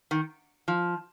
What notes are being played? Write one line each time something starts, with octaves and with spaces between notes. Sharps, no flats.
D#3
F3